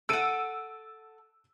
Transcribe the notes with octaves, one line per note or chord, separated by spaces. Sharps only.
A4 F#5 E6 D7 D#7